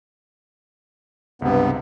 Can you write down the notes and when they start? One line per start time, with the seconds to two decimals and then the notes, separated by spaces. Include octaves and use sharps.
1.42 C#2 G2 C3 B3